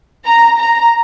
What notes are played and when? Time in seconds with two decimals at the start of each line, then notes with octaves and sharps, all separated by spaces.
0.24 A#5
0.59 A#5